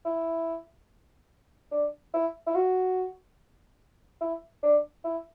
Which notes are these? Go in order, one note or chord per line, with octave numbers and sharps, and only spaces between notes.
E4
D4
E4
E4
F#4
E4
D4
E4